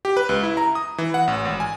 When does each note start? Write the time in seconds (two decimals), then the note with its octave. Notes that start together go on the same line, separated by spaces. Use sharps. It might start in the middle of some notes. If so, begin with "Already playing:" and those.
0.05 G4
0.17 B4
0.29 C#2
0.43 E4
0.57 A#5
0.75 D#6
0.98 E3
1.14 F#5
1.28 A1
1.45 G#1
1.60 G#5